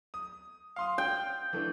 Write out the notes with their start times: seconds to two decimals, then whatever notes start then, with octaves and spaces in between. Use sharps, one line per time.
0.14 D#6
0.76 F5 C6 D#6
0.98 G5
1.53 E3 A3 D4